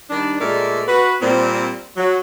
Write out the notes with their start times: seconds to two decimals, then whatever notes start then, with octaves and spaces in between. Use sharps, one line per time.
0.10 D#3 G3 D4
0.40 A#2 G#3 A3 A#4 D5
0.88 F#4 B4
1.20 A#2 G3 C4
1.97 F#3